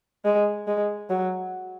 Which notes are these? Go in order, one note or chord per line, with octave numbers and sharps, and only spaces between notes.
G#3
G#3
F#3